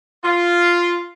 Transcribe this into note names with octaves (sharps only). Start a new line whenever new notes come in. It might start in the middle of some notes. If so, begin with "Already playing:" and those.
F4